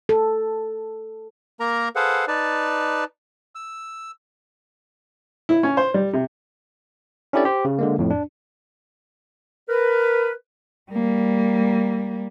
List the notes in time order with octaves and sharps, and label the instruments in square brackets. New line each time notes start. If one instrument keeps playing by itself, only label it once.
[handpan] A4
[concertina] A#3 A#4 A#5
G#4 A4 B4 C5 F5 F#5
D#4 B4 D5 A5
E6
[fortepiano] E4
C#4
C5
G3
C3
[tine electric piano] C#4 D4 E4 G4 A4 D5
G4 C5
C#3
D3 G#3 A#3
F2 A2
D4
[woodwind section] A#4 B4
[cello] G3 A#3